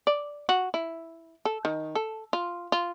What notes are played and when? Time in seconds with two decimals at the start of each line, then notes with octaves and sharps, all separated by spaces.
0.07 D5
0.49 F#4
0.74 E4
1.45 A4
1.65 D#3
1.95 A4
2.33 F4
2.72 F4